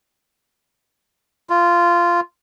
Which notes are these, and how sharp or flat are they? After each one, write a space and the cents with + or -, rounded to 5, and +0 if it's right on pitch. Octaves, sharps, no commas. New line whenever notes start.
F4 -15